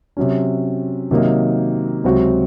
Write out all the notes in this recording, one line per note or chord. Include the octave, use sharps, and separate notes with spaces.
C3 F#3 C#4
C3 D#3 F#3 A#3 D#4
C#2 C3 F#3 C4 F#4